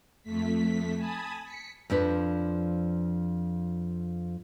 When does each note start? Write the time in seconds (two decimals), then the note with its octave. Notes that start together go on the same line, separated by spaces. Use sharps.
0.23 F2 A3 B6
0.97 G#5 A5 B5 D#6
1.44 B6 C#7
1.90 F2 F3 D4 B4